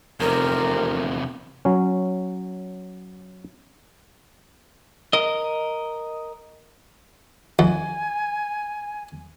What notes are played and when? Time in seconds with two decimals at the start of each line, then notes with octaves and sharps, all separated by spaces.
0.20 F1 E2 C3 A#4
1.65 F#3 C#4
5.13 A#4 D#5
7.59 F2 G#5